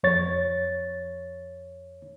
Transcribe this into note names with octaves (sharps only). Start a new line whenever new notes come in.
F2 C#5 A6